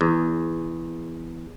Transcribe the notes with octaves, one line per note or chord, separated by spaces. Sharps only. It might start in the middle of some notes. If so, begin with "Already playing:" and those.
E2